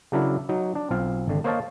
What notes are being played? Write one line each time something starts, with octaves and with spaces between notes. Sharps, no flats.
C#3 F#3 D4 E4 A#4
F#3 D#4
D4
B1 C4 F4 F5
G#1 D3
A#3 C5 C#5 D#5 F5 A5